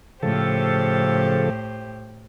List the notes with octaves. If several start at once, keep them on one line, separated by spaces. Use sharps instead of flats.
A2 C#3 F3 G4 A4 C5